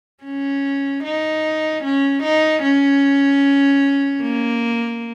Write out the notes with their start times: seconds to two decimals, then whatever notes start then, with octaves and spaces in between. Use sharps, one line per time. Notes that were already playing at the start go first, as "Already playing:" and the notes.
0.24 C#4
1.04 D#4
1.84 C#4
2.23 D#4
2.63 C#4
4.22 A#3